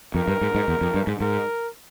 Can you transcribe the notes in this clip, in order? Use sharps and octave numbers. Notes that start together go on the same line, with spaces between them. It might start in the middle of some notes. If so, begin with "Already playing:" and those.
F2 A#4
G2
G#2
G#2
E2
F2
G2
G#2
G#2 A#4